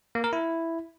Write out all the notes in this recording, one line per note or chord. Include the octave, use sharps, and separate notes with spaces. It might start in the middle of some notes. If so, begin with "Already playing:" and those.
A#3
A#4
E4